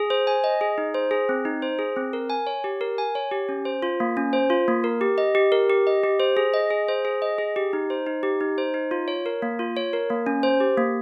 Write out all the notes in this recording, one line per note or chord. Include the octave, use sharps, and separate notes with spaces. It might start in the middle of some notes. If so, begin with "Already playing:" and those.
Already playing: G#4
C5
G#5
D#5
G#4
D#4
C5
G#4
C4
D#4
C5
G#4
C4
A#4
G#5
C#5
G4
A#4
G#5
C#5
G4
C#4
C5
F4
A#3
C#4
C5
F4
A#3
A#4
G4
D#5
G4
A#4
G4
D#5
G4
C5
G#4
D#5
G#4
C5
G#4
D#5
G#4
G4
D#4
C5
D#4
G4
D#4
C5
D#4
F4
C#5
A#4
A#3
F4
C#5
A#4
A#3
C#4
C5
G4
A#3